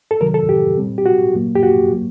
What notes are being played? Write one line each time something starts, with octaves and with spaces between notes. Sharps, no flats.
A4
C3 D#3 F#3 A#4
A4
G4
A#2 G3 C4
G4
F#4
A#2 F#3 A#3
G4
F#4
F#3 A#3